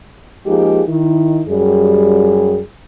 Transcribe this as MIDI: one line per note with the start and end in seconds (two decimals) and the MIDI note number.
0.46 0.82 53
0.46 0.82 56
0.46 0.82 58
0.46 0.82 63
0.46 0.82 67
0.46 0.82 68
0.88 1.40 51
0.88 1.40 64
1.48 2.60 42
1.48 2.60 55
1.48 2.60 68